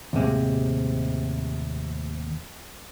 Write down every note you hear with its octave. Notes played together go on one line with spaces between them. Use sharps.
D#2 A2 C3 G#3